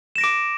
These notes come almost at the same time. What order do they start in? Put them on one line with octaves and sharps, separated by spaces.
E7 A#6 D7 D6